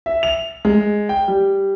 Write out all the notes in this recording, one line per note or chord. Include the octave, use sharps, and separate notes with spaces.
E5
F7
G#3
G5
G3